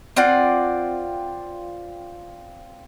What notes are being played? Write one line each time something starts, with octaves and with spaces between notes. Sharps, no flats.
C4 F4 D5 F#5